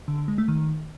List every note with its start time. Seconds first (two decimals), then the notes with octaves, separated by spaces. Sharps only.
0.08 D3
0.18 D3
0.28 G#3
0.38 A3
0.48 D#3